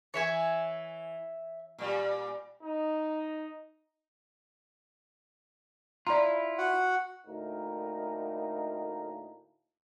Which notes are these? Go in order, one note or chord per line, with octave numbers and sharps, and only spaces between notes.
E3 C#5 E5 G#5
A#2 G3
D#4
E4 F4 D5 A#5
F#4 F#5
D2 A2 A#3 D#4 A#4